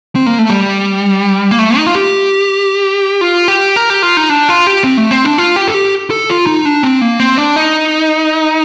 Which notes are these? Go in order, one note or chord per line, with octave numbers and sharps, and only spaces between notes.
C4
A#3
A3
G3
A#3
A3
D#4
F4
G4
F4
G4
A#4
G4
F4
D#4
D4
F4
G4
C4
A3
C4
D4
F4
G4
A4
G4
A4
F4
D#4
D4
C4
A#3
C4
D4
D#4